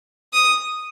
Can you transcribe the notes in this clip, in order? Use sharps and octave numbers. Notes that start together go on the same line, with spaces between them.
D#6